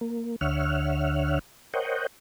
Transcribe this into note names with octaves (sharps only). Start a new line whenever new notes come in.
A#3
D2 D3 C#5 E5 F#5 F6
A#4 C5 C#5 D#5 F#5 G5